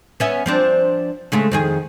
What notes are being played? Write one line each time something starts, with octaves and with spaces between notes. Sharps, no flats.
B3 C#4 E5
F3 C4 D4
C#3 G#3 A3
F2 D#3 G#4